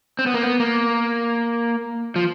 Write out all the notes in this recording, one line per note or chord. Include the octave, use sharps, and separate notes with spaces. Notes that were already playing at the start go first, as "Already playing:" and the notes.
C4
B3
A#3
B3
A#3
F3